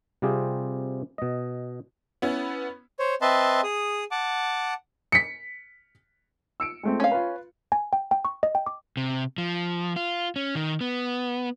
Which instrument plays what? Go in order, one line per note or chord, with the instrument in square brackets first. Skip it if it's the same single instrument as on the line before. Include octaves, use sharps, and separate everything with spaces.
[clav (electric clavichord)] C3 G3 C4 F4 G4 G#4
B2 D#5
[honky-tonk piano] B3 C#4 E4
[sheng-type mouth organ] C5 C#5
C4 B4 D#5 E5 A5 C6
G#4 D#6
F#5 A5 D6
[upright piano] B6 C#7
E6 C#7 D7
G#3 A3 C4
[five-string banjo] C#4 F5
[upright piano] F4 B4
[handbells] G#5
G5
G5
C#6
D#5
G5
D6
[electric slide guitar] C3
F3
F4
C#4
D#3
B3